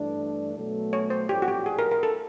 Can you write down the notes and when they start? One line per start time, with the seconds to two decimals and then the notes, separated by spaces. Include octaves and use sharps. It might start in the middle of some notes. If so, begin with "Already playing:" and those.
Already playing: G2 E3 A3 D4
0.55 B2 F#3 A3
0.93 C#5
1.10 C5
1.29 A#1 A2 F3 A3 D4 G4
1.42 F#4
1.48 G4
1.66 G#4
1.79 A#4
1.91 A#4
2.03 A4